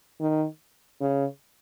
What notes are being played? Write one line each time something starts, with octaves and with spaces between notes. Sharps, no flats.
D#3
C#3